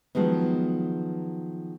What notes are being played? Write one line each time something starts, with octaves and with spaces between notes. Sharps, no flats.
D#3 F3 F#3 G#3 B3